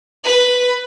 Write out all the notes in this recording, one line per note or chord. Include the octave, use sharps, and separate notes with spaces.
B4